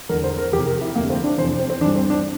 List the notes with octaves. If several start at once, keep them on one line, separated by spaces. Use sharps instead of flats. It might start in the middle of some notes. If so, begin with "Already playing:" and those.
E2 D3 A#4
C5
A#4
F2 C3 E3 G4
A#4
E4
F2 D3 A#3
C4
D4
F2 C3 E3 C5
C4
C4
G2 E3 D4
C4
D4